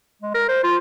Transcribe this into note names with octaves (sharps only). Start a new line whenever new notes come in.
G#3
A#4
C5
F4